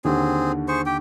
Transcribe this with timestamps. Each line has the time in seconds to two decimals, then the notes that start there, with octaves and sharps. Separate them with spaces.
0.05 D#2 D3 C4 G#4
0.68 G#4 C5 C#6
0.86 G4 G5